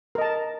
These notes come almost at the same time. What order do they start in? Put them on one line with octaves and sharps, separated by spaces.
A#4 D#5 A5